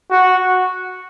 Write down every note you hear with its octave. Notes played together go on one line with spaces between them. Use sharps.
F#4